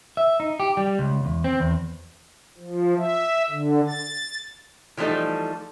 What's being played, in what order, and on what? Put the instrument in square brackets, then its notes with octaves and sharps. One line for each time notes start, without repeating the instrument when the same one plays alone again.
[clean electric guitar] E5
D#4
G4
G3
C#2
E2
C4
E2
[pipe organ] F3
E5
D3
A6
[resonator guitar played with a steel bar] E3 F3 G3 A3 D#4 A4